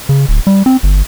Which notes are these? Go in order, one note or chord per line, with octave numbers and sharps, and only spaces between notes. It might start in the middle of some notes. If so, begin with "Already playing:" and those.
C#3
D1
G3
C4
G1